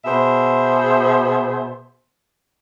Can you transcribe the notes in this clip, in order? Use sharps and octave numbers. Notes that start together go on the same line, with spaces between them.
B2 G#4 C5 E5